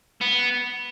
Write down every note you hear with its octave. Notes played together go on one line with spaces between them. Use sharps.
B3